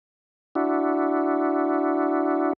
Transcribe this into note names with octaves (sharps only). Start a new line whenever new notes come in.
D4 E4 F#4